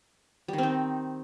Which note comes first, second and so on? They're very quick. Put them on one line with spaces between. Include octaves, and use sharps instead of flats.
G3 D#3 C4 D#4